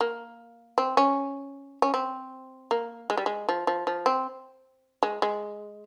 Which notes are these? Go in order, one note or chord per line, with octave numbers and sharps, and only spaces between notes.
A#3
C4
C#4
C#4
C4
A#3
G#3
G3
G#3
F3
F3
F3
C4
G#3
G#3